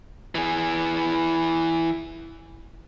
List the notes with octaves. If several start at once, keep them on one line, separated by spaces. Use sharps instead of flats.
E3 G#4